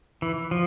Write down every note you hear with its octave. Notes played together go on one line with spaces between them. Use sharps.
E3
F3